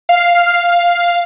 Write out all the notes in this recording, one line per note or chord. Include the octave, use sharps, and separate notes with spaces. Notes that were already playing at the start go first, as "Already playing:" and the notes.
F5